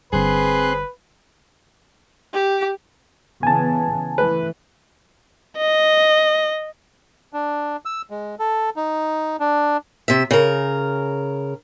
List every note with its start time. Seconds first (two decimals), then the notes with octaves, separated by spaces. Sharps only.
0.13 G1 G2 C4 G#4 B4 C6 F#6
2.33 G4
3.43 C#3 E3 B3 G#5 A5
4.18 E3 A3 B4
5.58 D#5
7.33 D4
7.85 E6
8.10 G#3
8.39 A4
8.76 D#4
9.40 D4
10.08 C3 E5
10.31 C#3 A#4